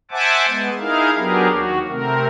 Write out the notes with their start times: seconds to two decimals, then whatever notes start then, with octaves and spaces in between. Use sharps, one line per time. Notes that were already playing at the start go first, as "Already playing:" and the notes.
0.11 C5 E5 F#5 G#5 A5 D6
0.48 G#3 B3
0.79 D#4 E4 G#4 A#4 F5
1.17 F#3 B3 D4 G4 G#4 A#4
1.49 D#2 F#4
1.89 C3 A3 C4 A#4